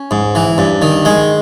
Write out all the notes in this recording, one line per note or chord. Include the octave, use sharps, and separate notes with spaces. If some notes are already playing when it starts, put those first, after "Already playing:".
Already playing: C#4
G#2
E3
G2
D#3
G#3